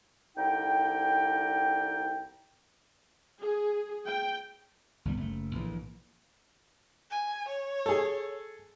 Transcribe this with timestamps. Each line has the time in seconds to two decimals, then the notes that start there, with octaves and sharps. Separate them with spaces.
0.37 C2 D3 D#4 G5
3.41 G#4
4.06 G5
5.05 G#1 C#2 G3 B3
5.17 F#1 A3
5.55 A#1 A2 E3
7.11 G#5
7.48 C#5
7.86 G#4 A4